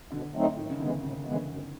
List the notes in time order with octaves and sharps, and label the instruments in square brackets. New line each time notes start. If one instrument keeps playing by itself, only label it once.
[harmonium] B2 [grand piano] D3
[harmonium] F#3 A3 C4 D#4
[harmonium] A2 [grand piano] D#3
[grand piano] C#3
[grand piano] D3 [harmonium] E3 G#3 B3
[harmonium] A2 [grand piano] C#3
[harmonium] E3 G#3 B3
[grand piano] D3
[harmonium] F#2